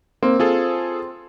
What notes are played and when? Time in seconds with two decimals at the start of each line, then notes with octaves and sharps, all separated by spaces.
0.23 A#3 C4
0.40 F4 G#4 A4